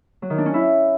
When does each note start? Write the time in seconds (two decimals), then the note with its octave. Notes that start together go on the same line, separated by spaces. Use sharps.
0.22 F#3
0.30 D#3
0.38 D4
0.46 C#4
0.54 E4